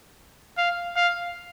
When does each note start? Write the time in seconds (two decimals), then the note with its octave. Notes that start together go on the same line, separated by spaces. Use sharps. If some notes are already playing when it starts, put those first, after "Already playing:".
0.58 F5
0.96 F5